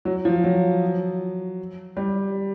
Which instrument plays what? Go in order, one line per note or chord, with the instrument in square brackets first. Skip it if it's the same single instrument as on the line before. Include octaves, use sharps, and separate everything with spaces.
[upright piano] F#3
F3
F#3
G3